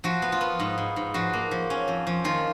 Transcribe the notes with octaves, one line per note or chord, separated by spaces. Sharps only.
F3 F#4
B3
F4
B3
G#2
G#2
G#2
F3 F#4
A#3
F3
C#4
F2
F3
D#3 F4